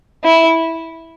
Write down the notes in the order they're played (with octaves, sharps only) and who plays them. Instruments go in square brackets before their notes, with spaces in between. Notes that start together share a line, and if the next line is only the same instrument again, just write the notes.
[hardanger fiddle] E4